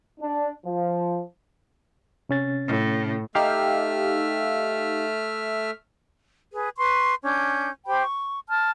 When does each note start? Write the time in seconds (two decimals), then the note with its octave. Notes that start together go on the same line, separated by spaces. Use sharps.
0.19 D4
0.65 F3
2.29 C3 C#4 A6
2.67 A2
3.35 A3 D#4 G4 E5 F5 F6
6.52 G#4 B4
6.77 B4 C6 C#6
7.23 C#4 D4 G6
7.86 G4 C5 G5 B5
8.02 C#6
8.49 A5 F6